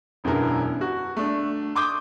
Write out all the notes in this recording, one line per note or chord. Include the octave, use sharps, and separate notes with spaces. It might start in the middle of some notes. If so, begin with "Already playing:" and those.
E1 F#2 D3 B3 E4 A#4
F#4
A3 D4
C6 D6 D#6 G6